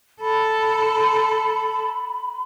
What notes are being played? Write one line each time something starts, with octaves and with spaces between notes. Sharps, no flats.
A4 B5